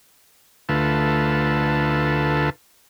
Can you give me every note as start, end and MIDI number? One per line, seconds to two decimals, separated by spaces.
0.69 2.50 38
0.69 2.50 50
0.69 2.50 57
0.69 2.50 65
0.69 2.50 71
0.69 2.50 81